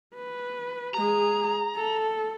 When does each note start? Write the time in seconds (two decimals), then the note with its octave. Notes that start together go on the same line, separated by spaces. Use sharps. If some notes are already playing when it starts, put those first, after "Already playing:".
0.15 B4
0.94 G#3 G#4 A#5
1.76 A4